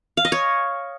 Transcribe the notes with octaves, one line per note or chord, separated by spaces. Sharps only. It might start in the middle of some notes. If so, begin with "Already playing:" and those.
F5
D#5
C#5